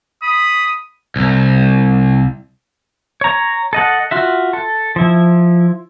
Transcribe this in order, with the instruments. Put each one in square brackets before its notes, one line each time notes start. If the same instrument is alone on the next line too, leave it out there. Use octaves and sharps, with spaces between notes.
[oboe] B5 [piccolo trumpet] D#6
[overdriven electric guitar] C2
[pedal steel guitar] C#5 A#5
A4 D#5 F#5
F4 F#4 E5
A4
F3 E4